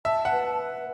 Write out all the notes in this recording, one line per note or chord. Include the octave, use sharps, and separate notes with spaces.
E5 A5
F#5
B4